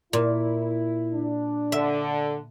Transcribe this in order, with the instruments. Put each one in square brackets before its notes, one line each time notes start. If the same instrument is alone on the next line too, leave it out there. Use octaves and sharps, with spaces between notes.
[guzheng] A#2 [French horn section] E4
[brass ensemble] D4
[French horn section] D3 [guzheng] E5